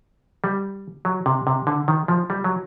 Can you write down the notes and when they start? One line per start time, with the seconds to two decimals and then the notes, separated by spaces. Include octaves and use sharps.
0.44 G3
1.05 F#3
1.26 C3
1.47 C3
1.67 D3
1.88 D#3
2.08 F3
2.30 G3
2.44 F#3